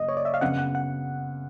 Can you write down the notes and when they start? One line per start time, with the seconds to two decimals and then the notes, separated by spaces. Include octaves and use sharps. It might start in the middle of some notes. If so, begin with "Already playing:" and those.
Already playing: F#1 D#5
0.08 C#5
0.17 D5
0.25 E5
0.34 F5
0.41 F#2 C#3 F#3 B3 F#5
0.59 F#5
0.75 F#5